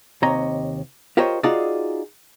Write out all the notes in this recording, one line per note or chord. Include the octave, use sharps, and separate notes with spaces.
D#2 C3 C#5 D#5 A#5
F4 G4 A#4 C5 C#5 D#5
D#4 F4 F#4 G#4 D5